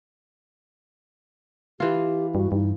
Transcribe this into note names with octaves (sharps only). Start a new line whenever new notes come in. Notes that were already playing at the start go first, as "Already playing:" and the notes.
E3 F4 G4
G2 F#4
G2 D#4